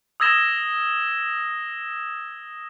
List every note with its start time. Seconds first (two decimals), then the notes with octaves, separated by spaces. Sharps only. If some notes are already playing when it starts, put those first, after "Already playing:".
0.20 D#6 E6 G#6 A#6 E7 G7